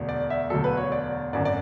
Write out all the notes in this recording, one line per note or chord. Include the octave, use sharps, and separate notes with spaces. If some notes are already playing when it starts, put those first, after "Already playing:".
Already playing: E1 D2 D3 F#3
D5
E5
E1 D2 D3 F#3 A4
B4
C#5
D5
G#1 F#2 D3 D5
D5